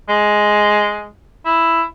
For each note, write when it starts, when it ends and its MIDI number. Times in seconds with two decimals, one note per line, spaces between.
0.09 1.08 56
1.46 1.82 64